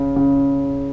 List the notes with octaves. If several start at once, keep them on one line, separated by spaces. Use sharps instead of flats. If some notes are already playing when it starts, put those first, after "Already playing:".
Already playing: C#3
C#3